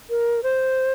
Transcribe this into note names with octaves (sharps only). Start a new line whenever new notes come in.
A#4
C5